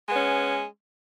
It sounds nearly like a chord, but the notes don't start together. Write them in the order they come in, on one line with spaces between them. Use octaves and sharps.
G#3 B3 C#4